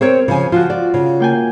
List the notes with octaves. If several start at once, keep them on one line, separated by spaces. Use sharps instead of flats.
C4 A#4 C#5
C#3 F3 G#5
F3 F4 F#4
D5
C#3
A#3 G5 G#5